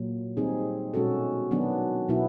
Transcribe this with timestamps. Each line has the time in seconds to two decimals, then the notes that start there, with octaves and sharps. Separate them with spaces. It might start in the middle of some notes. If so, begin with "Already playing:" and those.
Already playing: A#2 F#3 A#3
0.37 D#3 G3 C4 D#4 G#4
0.94 B2 G#3 C#4 F#4 A4
1.51 D#3 F#3 B3 D4
2.08 B2 F#3 B3 E4